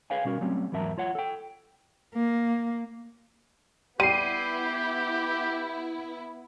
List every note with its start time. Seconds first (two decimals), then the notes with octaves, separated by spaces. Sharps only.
0.10 G#4 B4 C#5 F5 G5 G#5
0.25 B2 G3 C#4 F#4 A#4
0.41 F#3 G3 A3 C4 C#4
0.72 E2 G#2 F#3 A#4 E5 A5
0.98 F4 C#5 F#5
1.15 A4 G5
2.15 A#3
4.00 G3 B3 E4 G4 C7 D#7